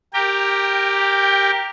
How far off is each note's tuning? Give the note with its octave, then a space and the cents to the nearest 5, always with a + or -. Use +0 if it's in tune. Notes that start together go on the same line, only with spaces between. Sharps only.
G4 +0 A#4 +0 G5 +20